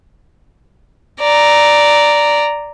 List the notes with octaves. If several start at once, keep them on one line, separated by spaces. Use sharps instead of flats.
D5 A#5